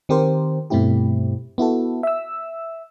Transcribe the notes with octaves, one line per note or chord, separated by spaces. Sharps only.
D#3 C4 G4 A#4 C5
G2 B2 A3 C4 E4 G4
B3 E4 F#4 A4
E5 E6